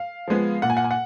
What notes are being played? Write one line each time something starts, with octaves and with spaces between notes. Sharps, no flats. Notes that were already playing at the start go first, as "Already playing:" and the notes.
Already playing: F5
F3 G#3 B3
A#2 F#5
G#5
F#5
G#5
F#5